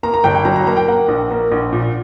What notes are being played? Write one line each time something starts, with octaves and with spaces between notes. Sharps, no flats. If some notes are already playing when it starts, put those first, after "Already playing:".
A#3 A#5
A#5
G1 G5
G5
F#3 A#5
A#5
A#3 A#5
G5
A#3 F#5
A#1
A#3
A#1
A#2